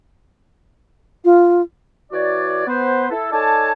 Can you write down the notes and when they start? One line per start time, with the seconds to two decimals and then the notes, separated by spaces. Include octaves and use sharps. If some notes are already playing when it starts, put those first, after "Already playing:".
1.25 F4
2.11 E3 F#4 C#5 D5
2.67 B3 B4 C5
3.10 E4 A4
3.31 D#4 A4 C#5 D5 G#5 A5